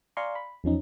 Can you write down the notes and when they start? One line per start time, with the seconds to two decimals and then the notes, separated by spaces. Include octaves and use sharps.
0.17 D5 F5 G#5 A#5 C6 C#6
0.35 B5
0.64 E2 F3 C#4 D#4